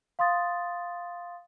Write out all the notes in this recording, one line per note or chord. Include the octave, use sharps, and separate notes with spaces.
F5 C6 D#6 A6